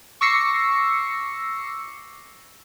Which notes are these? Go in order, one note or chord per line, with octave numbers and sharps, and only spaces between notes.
C#6 D6 E6 A#6 C7 C#7